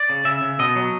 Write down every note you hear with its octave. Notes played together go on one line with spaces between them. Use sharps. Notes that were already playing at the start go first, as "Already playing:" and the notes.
Already playing: D5
C#3
C#3 E5
C#3
B2 D#5
F#3